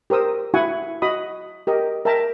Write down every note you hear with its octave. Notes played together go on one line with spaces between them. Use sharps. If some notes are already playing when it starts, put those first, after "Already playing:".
G4 A#4 C5 D#6 E6
E4 F#4 F#5 G#5 C#6
F#4 D#5 B5 D#6
G4 A#4 D#5
A#4 E5 G5 A5 A#5